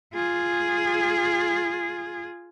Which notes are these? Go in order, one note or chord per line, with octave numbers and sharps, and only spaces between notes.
F4 G#4